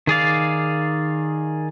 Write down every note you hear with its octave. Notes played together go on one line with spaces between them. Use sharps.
D#3 G#4 D5 F5